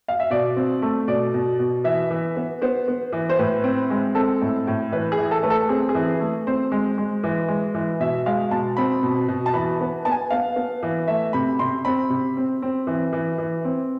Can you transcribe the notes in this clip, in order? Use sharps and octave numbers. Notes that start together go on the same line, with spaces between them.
F5
E5
B2 D5
C4
A3
B2 D5
B2
B2
E3 E5
E3
B3
B3 C5
B3
E3
C5
A2 B4
C4
G#3
C4 A4
A2
A2
E3 B4
G#4
E3
A4
A3 B4
A4
C4 G#4
G#4
E3
A3
C4 C5
G#3
G#3
E3
G#3
E3
B2 E5
G#3 F5
B2 A5
C4 B5
B2
B2
A5
E3 B5
B3
B3 A5
G#5
B3 F5
B3
E3
A3 E5
C3 B5
C3 C6
C4 B5
C3
C4
C4
E3
E3
E3
C4